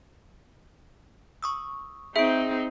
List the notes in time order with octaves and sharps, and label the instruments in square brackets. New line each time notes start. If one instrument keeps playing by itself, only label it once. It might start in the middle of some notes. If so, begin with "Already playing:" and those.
[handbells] C#6 D#6 E6
[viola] C4 D#4 [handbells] G#4 D7 [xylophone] E5